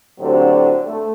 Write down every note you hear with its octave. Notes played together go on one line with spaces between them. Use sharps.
A2 D3 F#3 C4 F#4 G4
A3